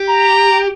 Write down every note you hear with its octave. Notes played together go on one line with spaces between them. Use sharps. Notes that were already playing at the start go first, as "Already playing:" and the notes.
Already playing: G4
A#5